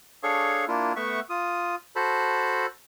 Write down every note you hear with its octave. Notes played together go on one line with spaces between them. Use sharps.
D4 G#4 A4 C#5 F5 C#6
A#3 D4 E4 F4
A3 B3 E5 F#5 C#6
F4 D#6
F#4 A4 C5 A5 B5